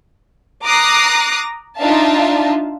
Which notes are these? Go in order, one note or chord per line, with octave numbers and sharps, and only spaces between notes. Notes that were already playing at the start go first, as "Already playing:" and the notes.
A#5 D6 D#6 F#6 A#6 C7
D4 D#4 F4 E5 F5 A5